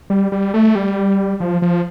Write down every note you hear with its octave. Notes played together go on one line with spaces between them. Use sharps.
G3
G3
A3
G3
F3
F3